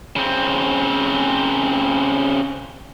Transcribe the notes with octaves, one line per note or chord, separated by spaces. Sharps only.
C#3 C4